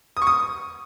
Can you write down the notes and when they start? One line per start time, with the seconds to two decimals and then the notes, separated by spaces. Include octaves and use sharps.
0.17 D#6
0.22 C#6
0.27 D#6